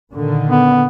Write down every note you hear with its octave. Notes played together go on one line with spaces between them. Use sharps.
A#2 D3 D#3
B3